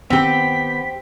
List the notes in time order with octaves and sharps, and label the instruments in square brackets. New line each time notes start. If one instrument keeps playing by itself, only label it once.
[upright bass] D#3 D#4 [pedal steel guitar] B3 G5 [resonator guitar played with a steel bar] C4 G4 [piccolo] B6